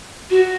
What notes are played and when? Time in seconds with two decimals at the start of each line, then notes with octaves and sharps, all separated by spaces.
0.30 F#4